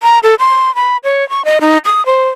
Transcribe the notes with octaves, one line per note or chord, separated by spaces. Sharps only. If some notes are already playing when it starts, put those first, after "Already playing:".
A#5
A4
C6
B5
C#5
C#6
D#5
D#4
D#6
C5